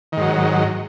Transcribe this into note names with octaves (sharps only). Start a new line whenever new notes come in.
G#2 D#3 F#3